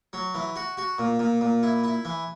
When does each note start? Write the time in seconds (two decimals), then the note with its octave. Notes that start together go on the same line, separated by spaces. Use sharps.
0.13 F#3
0.34 E3
0.56 F#4
0.77 F#4
0.98 A#2
1.19 A#2
1.41 A#2
1.63 E4
1.84 E4
2.05 E3